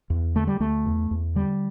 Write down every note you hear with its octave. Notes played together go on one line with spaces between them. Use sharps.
E2
D3 A3
G3
D2 A3
E2
E2
D3 G3